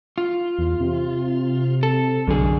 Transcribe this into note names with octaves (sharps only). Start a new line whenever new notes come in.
F4
E2
C3
A4
B1 F#2 D3 G#4